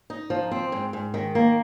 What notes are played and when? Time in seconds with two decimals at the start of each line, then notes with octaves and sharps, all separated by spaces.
0.10 D#4
0.30 F3
0.51 C4
0.72 G#2
0.93 G#2
1.14 D#3
1.35 A#3